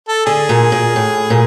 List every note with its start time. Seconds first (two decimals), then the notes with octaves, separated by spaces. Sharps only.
0.08 A4
0.26 D3 G#4
0.49 A#2
0.72 A#2
0.96 A2
1.30 A#2